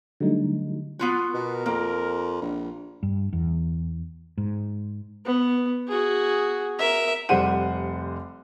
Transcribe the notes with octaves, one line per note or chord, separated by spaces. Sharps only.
D3 F#3 G3 A3 D#4
B3 F4 F#4
B2 A#4
F2 A#3
A#1
G2
E2
G#2
B3
F#4 G#4
A#4 E5
F1 G3 C5 F#5 D#7